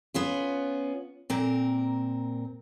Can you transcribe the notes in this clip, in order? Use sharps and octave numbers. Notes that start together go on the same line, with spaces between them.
B3 C#4 F4
A#2 C4 A#4